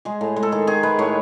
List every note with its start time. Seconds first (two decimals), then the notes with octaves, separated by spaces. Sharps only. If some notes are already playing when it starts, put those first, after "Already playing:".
0.05 G#3 G#4
0.21 A2
0.36 G#3
0.43 A4
0.52 D#3 G#4
0.67 D#3 G#4
0.83 G#3 B4
0.99 A2 C#5